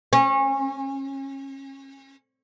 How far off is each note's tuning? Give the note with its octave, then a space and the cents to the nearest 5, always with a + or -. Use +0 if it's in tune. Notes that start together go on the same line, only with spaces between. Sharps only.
C#4 -30